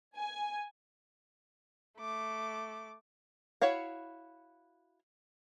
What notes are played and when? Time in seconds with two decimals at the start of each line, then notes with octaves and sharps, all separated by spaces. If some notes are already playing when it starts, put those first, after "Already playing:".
0.17 G#5
1.98 A3 D6
3.61 E4 F#4 C#5 F5 F#5